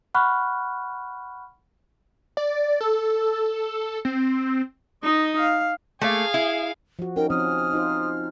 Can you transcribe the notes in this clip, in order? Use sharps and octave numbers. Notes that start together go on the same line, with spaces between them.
F#5 B5 C#6 F6 F#6
D5
A4
C4
D#4 D#5
F5
A3 A#3 G#4 F5
E4
F3 F#4
C#4 D#4 A#4 G5
F3 C4 C#4 D#6 F6
D#4 F4 C5